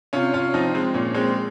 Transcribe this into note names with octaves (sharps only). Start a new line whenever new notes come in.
C3 C#4 F4
C#4 F4
F3 C4 D#4
G#3 C4
A#2 A#3 C#4
G#3 C4